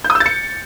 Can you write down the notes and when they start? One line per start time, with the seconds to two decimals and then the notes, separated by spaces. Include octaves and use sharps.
0.04 G6
0.10 D#6
0.15 E6
0.20 A6
0.26 C#7